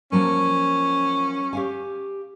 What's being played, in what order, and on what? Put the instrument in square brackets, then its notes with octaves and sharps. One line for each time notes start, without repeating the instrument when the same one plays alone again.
[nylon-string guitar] F3 F#3 A#3 [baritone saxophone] C#4
[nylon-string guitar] G4 F5 G#5